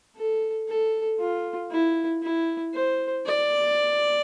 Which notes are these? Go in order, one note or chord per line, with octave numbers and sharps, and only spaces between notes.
A4
A4
F4
E4
E4
C5
D5